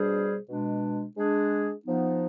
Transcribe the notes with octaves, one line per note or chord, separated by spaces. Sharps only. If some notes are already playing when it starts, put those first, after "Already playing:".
Already playing: B2 G3 D4 G#4 C5
B2 G#3 D4
G#3 D4 G#4
F3 B3 D#4